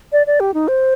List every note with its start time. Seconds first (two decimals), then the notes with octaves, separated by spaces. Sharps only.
0.12 D5
0.27 D5
0.40 G4
0.54 D#4
0.68 C5